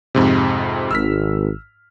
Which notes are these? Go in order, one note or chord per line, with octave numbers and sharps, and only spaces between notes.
F2 G#2 C3
G#1 E6 F6 B6